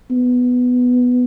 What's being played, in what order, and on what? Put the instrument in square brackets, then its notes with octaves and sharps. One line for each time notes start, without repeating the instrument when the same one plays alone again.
[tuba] B3